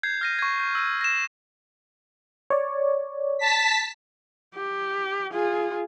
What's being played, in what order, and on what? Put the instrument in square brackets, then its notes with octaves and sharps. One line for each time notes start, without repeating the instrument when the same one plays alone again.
[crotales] G6 G#6 C7
F6 A#6 D#7
C#6 G#6
G6
E6 A#6 D#7
A#6 E7
[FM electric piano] C#5 D5
[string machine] A5 B6
[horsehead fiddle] G4
F4 G#4